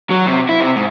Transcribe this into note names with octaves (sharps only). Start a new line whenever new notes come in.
F#3
C3
E4
C3
G#2